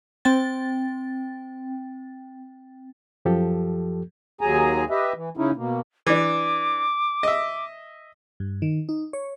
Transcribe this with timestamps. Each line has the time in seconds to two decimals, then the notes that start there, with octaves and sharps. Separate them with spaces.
0.25 C4 G5 A6
3.25 F#2 F3 G4 A4
4.41 D#2 F#3 G#4 G#5 A#5
4.90 G4 B4 D#5 E5
5.15 E3
5.37 C#3 C#4 D#4 E4
5.56 B2 A#3
6.07 E3 D4 D6
7.23 D#5 E5
8.40 G2
8.62 D#3
8.89 D#4
9.13 C#5